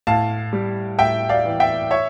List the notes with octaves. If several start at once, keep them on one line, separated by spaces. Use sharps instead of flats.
A2 F5 A5
G3
A2 E5 G5
D5 F5
E3
E5 G5
C#5 E5